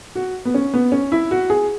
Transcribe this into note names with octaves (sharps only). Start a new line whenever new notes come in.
F#4
B3
C#4
B3
C#4
E4
F#4
G#4